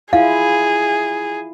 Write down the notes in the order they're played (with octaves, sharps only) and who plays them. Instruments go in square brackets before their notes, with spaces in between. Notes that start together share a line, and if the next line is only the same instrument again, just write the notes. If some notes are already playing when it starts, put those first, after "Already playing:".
[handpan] E4 F4 [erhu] G#4 [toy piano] F5